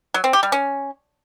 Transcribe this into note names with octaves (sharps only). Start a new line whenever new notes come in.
F#3
C4
G4
G3
C#4